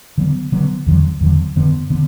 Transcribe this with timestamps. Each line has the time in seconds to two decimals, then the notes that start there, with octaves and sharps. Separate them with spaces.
0.18 D3 F#3 B3
0.52 D3 F#3 B3
0.86 E2 D3 F#3
1.21 E2 D3 F#3
1.56 F#2 D3 B3
1.90 D3 B3